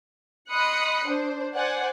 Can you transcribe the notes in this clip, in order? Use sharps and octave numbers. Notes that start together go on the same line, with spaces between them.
D#5 B5 C6 D#6 F#6 C#7
D4 C5
C5 D5 F#5 G#5